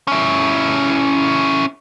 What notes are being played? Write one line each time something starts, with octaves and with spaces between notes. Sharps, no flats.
C#4 E4